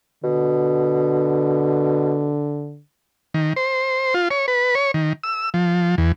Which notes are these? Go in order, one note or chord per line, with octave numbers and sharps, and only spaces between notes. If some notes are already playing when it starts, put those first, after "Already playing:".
B2 D3
D#3
C5
F4
C#5
B4
C#5
D#3
E6
F3
E2